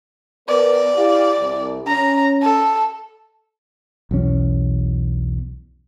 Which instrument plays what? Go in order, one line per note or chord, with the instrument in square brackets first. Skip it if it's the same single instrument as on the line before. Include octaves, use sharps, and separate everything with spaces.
[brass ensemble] B3 A#4 B4 [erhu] D5
[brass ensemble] E4 G4 F5
C2
[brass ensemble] C#4 [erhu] A#5
[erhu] A4
[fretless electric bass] B1 E2 C#4